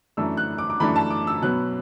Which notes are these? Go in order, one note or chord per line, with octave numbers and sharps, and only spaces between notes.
F#2 E3 A3 D4 E6
F#6
D6
D6
F#2 E3 A3 D4 B5
A5
D6
E6
B2 F#3 B3 F#6